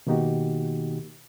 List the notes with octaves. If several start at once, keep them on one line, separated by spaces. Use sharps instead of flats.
B2 D#3 A#3 D#4 F#4 G4